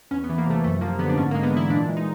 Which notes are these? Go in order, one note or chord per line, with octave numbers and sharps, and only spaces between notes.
E2 C#4
B3
E3
A#3
C3 A3
F#2 A3
F3 A#3
D3 B3
D4
G#2 C#4
A#3
G#3
B3
E3 E4
A#2 D4
G#3
D#4